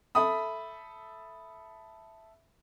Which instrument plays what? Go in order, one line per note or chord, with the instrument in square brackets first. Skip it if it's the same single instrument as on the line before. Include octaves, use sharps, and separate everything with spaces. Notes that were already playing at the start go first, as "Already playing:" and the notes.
[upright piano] A4 E5 B5 D#6